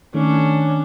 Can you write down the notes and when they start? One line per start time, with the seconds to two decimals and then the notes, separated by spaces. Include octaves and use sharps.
0.14 D#3 A3 C#4 D4